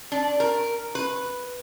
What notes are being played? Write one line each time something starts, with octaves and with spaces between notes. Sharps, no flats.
D4
A#4
B4